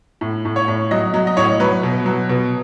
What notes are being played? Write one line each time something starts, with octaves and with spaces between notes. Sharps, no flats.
A2
A2
C#5
A2
F#3 D#5
F#3
D#5
A2 C#5
F#3 B4
B2
F#3
B2